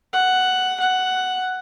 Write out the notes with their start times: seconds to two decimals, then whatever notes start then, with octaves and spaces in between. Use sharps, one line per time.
0.13 F#5
0.80 F#5